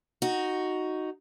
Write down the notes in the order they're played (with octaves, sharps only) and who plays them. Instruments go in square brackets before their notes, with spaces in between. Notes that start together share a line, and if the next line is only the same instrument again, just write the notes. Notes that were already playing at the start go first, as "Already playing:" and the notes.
[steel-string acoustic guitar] D#4 F#4